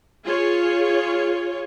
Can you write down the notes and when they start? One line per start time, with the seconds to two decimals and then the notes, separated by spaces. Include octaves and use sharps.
0.25 F4 G#4 C#5